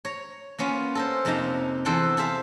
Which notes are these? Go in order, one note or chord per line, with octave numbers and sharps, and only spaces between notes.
C#5 A#5
A#3 B3 C#4 F4
A4 A#4 C5
F2 C3 A#3 D#4 A5 A#5
E2 G#4 A4 C5 F#5 G5
G#4 A4 C5 E5 F5